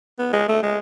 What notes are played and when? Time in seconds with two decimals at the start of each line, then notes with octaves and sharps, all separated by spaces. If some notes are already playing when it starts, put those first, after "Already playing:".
0.19 B3
0.33 G#3
0.48 A3
0.63 G#3